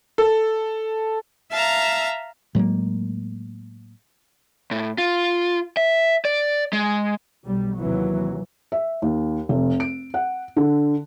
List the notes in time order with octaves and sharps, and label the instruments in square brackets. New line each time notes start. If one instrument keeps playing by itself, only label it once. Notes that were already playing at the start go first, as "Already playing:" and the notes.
[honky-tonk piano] A4
[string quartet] E5 F5 A5 A#5
[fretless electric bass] A2 F#3 G#3 A#3
[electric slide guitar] A2
F4
E5
D5
G#3
[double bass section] B1 G3
D#2 C3 E3 F#3
[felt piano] E5
D#2
F1
D7
F#5
D3